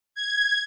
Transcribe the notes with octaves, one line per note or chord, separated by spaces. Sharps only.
G#6